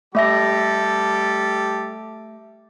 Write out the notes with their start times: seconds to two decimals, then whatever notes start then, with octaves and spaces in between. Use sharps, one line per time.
0.15 G3 A3 G4 A4 E5 A#6